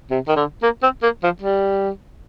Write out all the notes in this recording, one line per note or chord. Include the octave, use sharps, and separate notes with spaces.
C3
D#3
D3
A#3
C4
A#3
F3
G3